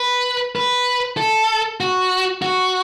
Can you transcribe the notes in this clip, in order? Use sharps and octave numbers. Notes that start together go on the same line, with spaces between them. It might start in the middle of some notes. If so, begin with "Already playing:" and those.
Already playing: B4
B4
A4
F#4
F#4